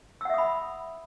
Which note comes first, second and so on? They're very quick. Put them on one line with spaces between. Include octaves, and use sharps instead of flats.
E6 F#5 E5 D#6 B5